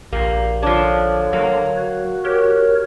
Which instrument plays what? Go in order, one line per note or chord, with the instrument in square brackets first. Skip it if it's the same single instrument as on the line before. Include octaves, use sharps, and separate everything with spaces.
[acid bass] A#1 [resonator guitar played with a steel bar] A#3 [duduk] G4
[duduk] D3 [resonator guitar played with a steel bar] F3 D4 [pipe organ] C#5
[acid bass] F#3 [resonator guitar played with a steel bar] A#3
[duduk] F#4
[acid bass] G4 [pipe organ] A#4 C#5